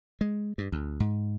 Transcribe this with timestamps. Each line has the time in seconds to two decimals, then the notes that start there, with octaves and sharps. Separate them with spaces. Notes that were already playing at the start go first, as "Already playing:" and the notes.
0.21 G#3
0.58 G2
0.72 D2
1.00 G#2